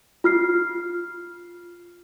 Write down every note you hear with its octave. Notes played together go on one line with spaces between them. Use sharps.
F4 F6 C7